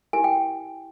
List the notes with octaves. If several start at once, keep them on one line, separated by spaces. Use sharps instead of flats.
E4 G4 A#4 G#5
G5